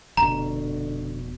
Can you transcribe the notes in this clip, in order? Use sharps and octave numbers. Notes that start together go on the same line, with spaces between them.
F1 B2 D3 A#5